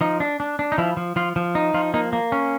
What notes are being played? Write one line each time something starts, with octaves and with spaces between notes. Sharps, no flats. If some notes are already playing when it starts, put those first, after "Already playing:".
F3 D#4
D4
D4
D4
D#4
F3 E4
F3
F3 F4
F3
D#4
F3 F4
A#3 D#4
A#3
C#4